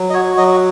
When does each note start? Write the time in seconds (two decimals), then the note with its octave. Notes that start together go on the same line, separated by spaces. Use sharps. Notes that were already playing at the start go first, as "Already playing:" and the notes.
Already playing: F#3
0.10 D#5
0.14 F#4 C#5
0.37 F#3 D#5